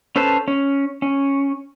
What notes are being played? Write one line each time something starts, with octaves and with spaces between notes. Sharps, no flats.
C#4 A4 B4 C5 A5
C#4
C#4